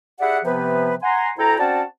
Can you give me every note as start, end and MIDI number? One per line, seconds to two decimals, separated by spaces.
0.20 0.39 64
0.20 0.39 67
0.20 0.39 68
0.20 0.39 74
0.20 0.39 76
0.20 0.39 78
0.45 0.94 48
0.45 0.94 53
0.45 0.94 59
0.45 0.94 71
1.02 1.29 78
1.02 1.29 80
1.02 1.29 82
1.02 1.29 84
1.38 1.57 38
1.38 1.57 64
1.38 1.57 69
1.38 1.57 79
1.38 1.57 82
1.58 1.82 60
1.58 1.82 61
1.58 1.82 66
1.58 1.82 74
1.58 1.82 78
1.58 1.82 81